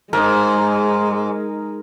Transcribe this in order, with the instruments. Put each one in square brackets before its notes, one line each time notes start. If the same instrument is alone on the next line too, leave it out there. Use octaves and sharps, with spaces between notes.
[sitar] G#2 [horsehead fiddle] G#3 [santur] D#4 A#4